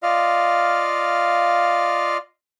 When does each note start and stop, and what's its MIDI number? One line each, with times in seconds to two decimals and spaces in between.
0.03 2.17 65
0.03 2.17 74
0.03 2.17 75
0.03 2.17 77
0.03 2.17 89